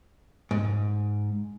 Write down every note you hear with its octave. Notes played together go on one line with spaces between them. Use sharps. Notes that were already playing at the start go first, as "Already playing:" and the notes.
G#2